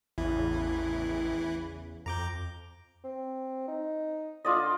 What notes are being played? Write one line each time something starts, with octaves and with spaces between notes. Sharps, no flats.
A1 E2 C#3 E3 E4
F2 A#5 D6 G6
C4
D#4
D3 F4 D5 D#5